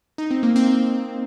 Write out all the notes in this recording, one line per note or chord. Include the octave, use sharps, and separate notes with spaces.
D#4
C4
A#3
C4